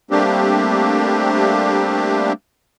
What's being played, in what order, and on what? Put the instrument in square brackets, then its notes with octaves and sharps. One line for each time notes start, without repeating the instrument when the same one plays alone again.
[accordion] G3 A3 A#3 C4 D4 G4